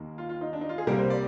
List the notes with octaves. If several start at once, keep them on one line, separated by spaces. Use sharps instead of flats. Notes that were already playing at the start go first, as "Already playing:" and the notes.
Already playing: D#2 D#3 A#3
F4
F4
D#4
D4
D#4
F4
G#4
C2 C3 G3 A#3 A#4
C5
D5